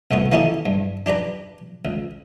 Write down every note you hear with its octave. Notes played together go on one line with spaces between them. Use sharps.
C2 A2 C3 B3
A#3 C#4 D#4 E4 G4 A4
G2
D4 G4 B4 A#5
C#2